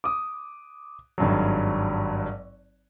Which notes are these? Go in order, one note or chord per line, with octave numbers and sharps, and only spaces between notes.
D6 D#6
G#1 G2 F#3